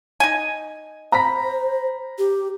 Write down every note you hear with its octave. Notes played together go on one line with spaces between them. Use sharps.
D#4 G#5
C5 A#5 B5 B6
G4